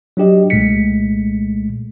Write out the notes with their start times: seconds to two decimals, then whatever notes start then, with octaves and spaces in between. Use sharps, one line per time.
0.17 F#3 D4 G4 D#5
0.50 C2 A#2 G#3 A3 B6 C#7